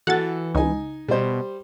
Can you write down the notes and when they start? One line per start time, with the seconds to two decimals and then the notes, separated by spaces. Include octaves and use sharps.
0.07 E3 F#4 A4 F#5 A6
0.55 C#2 D#4 G#5
1.08 B2 G3 C5